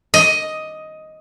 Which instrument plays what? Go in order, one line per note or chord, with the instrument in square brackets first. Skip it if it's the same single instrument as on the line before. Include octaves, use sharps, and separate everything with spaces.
[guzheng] D#5